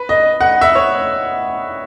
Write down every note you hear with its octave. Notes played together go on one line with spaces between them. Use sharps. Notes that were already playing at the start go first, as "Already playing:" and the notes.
Already playing: B4
D#5
F#5
E5
C#5